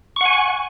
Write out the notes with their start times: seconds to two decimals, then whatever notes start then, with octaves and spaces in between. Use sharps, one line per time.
0.16 C#6
0.21 F#5
0.25 G#5